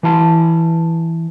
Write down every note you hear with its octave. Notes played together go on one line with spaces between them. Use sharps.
E3 E4 A5